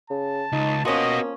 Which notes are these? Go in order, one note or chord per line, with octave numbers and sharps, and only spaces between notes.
C#3 A5
C#2 D#4
F3 A#3 B3 C#4 F#4 D#5